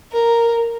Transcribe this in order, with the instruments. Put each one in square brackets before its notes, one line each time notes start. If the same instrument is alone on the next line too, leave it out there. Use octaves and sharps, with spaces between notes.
[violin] A#4